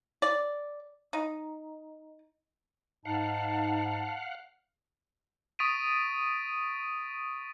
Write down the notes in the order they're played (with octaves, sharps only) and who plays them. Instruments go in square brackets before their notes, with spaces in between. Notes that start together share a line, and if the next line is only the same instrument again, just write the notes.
[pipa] D5
D#4
[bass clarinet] G#2 [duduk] D#4 [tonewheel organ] F5 F#5 [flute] A5
[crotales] C#6 D#6 A6 B6 D7 D#7